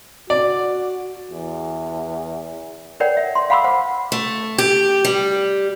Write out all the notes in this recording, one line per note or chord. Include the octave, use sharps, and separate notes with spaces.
F#4 D5
E2
A#4 B4 C#5 D5 F#5 G5
E5
C6
F5 F#5 B5 C6 D6 E6
C5 F#5
A3
G4
G3